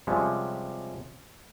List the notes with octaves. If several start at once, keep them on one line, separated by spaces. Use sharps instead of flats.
C3 F3 G3 G#3 C#4